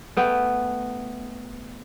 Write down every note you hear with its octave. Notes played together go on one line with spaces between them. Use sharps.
A3 B3 G5